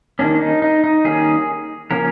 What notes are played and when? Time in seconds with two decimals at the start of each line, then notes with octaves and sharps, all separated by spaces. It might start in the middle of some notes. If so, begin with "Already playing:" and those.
0.19 D#3 G3 A#3 C#4 D4
0.41 D#4
0.62 D#4
0.84 D#4
1.05 D#3 G3 A#3 C#4 G#4
1.91 C#3 F3 A#3 C#4 A#4